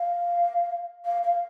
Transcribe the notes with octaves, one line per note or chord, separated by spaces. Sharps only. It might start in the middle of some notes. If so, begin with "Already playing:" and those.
Already playing: F5
F5
F5